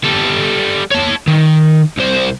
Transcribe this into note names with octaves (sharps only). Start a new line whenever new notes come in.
G3 A4
C#5 A5
D#3
C2 C5